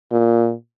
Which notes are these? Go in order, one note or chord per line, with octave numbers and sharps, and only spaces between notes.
A#2